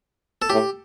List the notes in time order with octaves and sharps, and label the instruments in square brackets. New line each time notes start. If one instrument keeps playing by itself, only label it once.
[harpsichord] A4
[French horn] A2 [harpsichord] G4